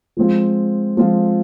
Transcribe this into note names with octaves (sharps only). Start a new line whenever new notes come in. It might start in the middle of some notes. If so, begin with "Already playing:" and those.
F3 G#3 C4 F4
F3 G#3 C4 F4